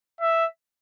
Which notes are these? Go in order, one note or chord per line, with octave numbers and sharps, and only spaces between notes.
E5